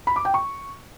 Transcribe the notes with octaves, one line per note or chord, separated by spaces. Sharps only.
B5
D6
G5
C#6